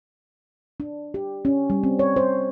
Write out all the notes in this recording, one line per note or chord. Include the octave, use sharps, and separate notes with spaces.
D4
G4
C#4
G3
C4
C#5
C5